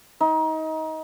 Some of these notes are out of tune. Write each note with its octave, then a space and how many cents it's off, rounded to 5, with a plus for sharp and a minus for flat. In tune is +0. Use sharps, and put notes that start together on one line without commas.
D#4 +25